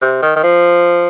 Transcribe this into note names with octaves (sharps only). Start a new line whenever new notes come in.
C3
D#3
D#3
F3